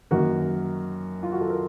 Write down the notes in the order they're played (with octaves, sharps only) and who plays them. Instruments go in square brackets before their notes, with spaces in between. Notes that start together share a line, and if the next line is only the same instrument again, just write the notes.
[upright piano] F#2 D#3 A#3 F#4 A#4
F4
F#4
A4
A#4